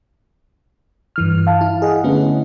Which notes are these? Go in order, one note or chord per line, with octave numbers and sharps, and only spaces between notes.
G2 E3 F6
F5 A5
E4
G#4 D#5 F#5
D3 A3 B3 C#4 E4